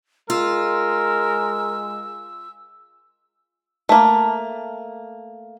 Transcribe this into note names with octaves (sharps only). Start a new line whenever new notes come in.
G#3 F4 A#4 E6
A3 A#3